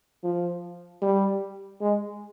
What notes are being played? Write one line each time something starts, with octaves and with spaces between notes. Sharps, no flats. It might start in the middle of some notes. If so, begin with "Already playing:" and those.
F3
G3
G#3